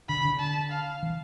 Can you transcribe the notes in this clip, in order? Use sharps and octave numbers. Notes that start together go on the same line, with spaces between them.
D3 B5
D3
A5
F5
E3